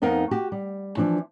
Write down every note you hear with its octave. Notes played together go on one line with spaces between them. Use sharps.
F2 B3 D#4 A#4 F5 F#5
F#4 G4
G3
E3 F3 D4